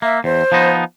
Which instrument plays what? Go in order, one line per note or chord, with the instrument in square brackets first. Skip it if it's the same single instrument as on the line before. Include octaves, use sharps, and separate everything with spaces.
[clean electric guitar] A#3 [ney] E5
[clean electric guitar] E2 [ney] C5
[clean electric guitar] F3 B3 D#4